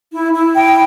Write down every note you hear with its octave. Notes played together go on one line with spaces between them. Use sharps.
E4
E4
G5